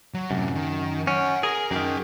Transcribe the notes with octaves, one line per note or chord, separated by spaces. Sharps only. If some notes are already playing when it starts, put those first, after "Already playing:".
F#3
F#2 A2 C3
D#3
C#4 F#5 G#5
G#4 A#4
F#2 D#3 G#4 G5